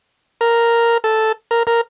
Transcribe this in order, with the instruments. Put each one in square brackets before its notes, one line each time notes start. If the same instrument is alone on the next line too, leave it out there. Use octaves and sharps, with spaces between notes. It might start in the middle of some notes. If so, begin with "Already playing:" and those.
[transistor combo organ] A#4
A4
A#4
A#4